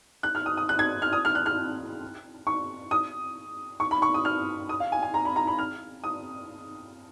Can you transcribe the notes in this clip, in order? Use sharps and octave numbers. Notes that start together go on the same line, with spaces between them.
F#6
F6
D#6
D#6
F#6
G#6
F6
D#6
F6
F#6
F6
C#6
D#6
C#6
B5
C#6
D#6
F6
D#6
F5
G#5
G#5
A#5
B5
A#5
B5
F6
D#6